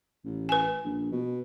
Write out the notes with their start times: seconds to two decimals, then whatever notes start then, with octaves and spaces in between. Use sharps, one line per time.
0.25 A1
0.49 B4 G#5
0.85 A#1
1.12 B2